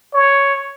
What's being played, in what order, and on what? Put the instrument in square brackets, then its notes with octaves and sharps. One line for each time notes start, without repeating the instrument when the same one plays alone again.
[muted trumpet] C#5